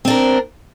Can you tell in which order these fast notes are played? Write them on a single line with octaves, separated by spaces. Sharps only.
C4 D4 A#4